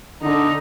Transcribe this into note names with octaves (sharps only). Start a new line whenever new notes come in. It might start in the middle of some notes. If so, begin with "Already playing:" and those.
D3 D#4